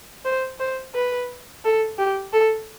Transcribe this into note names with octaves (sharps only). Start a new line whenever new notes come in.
C5
C5
B4
A4
G4
A4